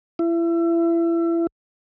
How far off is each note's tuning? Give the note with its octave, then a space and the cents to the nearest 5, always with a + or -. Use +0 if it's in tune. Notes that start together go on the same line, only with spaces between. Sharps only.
E4 +30